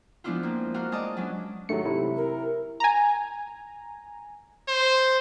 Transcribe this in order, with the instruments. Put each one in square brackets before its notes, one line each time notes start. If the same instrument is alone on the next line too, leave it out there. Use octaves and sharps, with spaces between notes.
[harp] F3 G#3 B3 D4 E4 F4
A#3 C4
D4 F4 F#4 F5 A#5
G#3 D5 D#5 A5 D6
F#3 C#4 D4
[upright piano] G#2 D#3 F#3 [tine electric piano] A3 C#7
[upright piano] C3 [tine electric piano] E4
[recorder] A#4
[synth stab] G#5 A#5
[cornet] C5